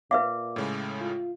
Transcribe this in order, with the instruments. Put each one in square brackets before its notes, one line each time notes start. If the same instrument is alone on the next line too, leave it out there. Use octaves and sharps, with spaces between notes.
[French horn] A#2 [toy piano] B4 E5 F5 [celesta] D6
[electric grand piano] A2 C#3 G#3
[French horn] F4